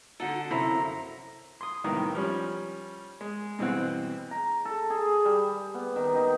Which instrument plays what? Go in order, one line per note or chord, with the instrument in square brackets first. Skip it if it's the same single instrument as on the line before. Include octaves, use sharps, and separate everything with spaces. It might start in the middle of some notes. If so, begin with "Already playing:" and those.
[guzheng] D3 A4 [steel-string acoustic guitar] D#4 F#4 F#5
[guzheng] F#2 F3 [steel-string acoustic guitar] C3 [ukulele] E4 [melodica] A#5
[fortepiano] C6 D#6
C2 A2 D#3 B3 A#5 D#6
F3 G3 C#4
G#3
G2 B2 E3 C4 F#5
[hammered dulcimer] A#5
A4
G#4
G3
B3
D#3
D#4